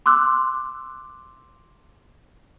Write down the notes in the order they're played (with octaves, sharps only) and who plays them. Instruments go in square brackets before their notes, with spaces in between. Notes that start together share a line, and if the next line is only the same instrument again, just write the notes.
[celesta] C6 D6 E6 F#6